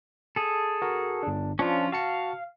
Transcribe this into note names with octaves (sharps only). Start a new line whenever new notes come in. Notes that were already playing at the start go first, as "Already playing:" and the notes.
G#4 A4
F#4 A#4
G1 D4
F3 C#4 D4 F4
F#4 F5 A5 C#7